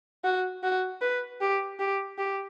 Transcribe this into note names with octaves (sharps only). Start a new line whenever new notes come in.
F#4
F#4
B4
G4
G4
G4